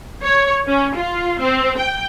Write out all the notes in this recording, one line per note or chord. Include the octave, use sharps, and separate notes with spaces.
C#5
C#4
F4
C4
G5